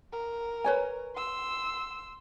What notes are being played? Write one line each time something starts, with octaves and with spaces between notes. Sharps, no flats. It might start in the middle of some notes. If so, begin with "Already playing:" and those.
A#4
B4 C#5 G#5
C6 E6